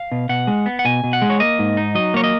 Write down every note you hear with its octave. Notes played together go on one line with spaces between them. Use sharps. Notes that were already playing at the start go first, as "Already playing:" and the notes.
Already playing: F5
B2
B2 F#5
G#3
B3
F#5
B2 G#5
B2
F#5
G#3
C#5
A#3 D#5
G#2
D#4
F#3 D#5
A#3 C#5
D#5